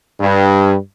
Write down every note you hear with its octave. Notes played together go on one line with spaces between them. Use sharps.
G2